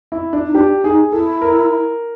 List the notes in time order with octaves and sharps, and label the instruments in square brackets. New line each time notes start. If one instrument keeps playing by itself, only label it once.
[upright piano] E4
D4
[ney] D#4
[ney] D4 [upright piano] G4
[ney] D#4 [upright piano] G#4
[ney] E4 [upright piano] A4
[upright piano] A#4